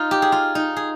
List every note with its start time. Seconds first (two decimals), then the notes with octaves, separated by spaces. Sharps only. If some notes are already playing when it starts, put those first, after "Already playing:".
Already playing: D#4 F4
0.11 G4
0.22 G#4
0.32 F4
0.55 D#4
0.76 G#4